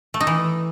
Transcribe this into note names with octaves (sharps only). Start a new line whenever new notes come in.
A3
D#4
E3